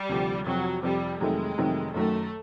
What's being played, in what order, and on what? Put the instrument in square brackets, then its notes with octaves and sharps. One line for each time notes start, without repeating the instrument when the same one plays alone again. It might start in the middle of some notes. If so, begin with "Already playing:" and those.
Already playing: [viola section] G3
[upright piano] D2 C3 F3
[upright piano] F2 C3 F3 [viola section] F#3
[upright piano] F2 C3 F3 [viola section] G3
[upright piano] F2 C3 D#3 F#3 A3 [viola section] G#3
[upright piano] F2 C3 D#3 F#3 A3
[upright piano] F#2 D#3 F#3 [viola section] A3